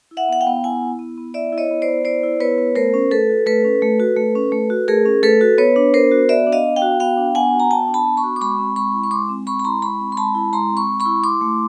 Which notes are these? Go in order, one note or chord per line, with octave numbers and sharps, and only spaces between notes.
E4
E5 F#5
B3 F#5
F5 G5
B3
E4 F#5 G#5
E4
B3
B3
E4 D5 E5
E4
C#5 D#5
B3
C5 D5
B3
E4 C5 D5
E4
B3 B4 C#5
B3
A3 A#4 C5
C#4
A3 A4 B4
F#4
A3 A4 B4
C#4
A3
F#4
A3
C#4
A3
F#4
A3 G#4 A#4
C#4
A3 A4 B4
F#4
B3 B4 C#5
D4
B3 A#4 C5
F#4
B3 D5 E5
D4
D#5 F5
B3
F5 G5
F#4
B3 F5 G5
D4
B3 F#5 G#5
F#4
A#5
B3 G5 A5
D4
A5 B5
B3
B5 C#6
F#4
D6
G#3 B5 C#6
C4
G#3 B5 C#6
E4
C#6
G#3 C6 D6
C4
G#3 B5 C#6
B5
E4 A#5 C6
G#3 B5 C#6
C4
C6
G#3 A5 B5
E4
G#3 A#5 C6
C4
B5 C#6
G#3
B5 C#6
E4
E4 C6 D6
A3